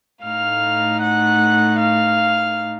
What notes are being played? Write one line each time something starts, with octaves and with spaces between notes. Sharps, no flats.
A2 A3 D#4 F5 F6
F#5 F#6
F5 F6